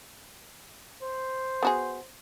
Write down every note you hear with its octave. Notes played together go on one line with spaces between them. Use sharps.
C5
B3 F#4 G#4